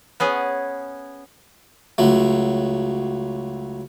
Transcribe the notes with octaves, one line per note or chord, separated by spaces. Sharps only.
B3 C#4 G#4
C#2 F#3 A3